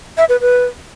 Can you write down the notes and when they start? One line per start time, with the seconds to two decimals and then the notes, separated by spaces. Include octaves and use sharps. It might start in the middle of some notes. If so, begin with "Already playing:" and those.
0.17 E5
0.29 B4
0.41 B4